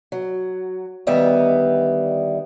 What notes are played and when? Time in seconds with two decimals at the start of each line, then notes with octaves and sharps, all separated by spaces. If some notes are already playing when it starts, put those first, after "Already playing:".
0.12 F#3
1.07 D2 D#3 G3 B3 D#5 E5